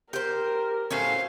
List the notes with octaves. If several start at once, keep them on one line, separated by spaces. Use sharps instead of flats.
G4 A#4 C5
A2 F#3 C#4 C5 F5